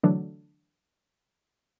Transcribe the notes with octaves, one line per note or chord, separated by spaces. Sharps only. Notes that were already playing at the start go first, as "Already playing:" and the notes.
D3 E3 F#3 A3 D4 A4